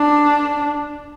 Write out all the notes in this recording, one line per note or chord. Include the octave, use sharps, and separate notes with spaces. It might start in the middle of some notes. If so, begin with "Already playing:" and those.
Already playing: D4